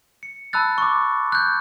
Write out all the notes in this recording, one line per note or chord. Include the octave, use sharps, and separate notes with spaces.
C#7
A5 B5 E6 F#6 A6
C#6 D6
F#6 G6